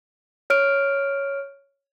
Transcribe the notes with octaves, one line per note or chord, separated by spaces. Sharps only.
C#5 F6 D7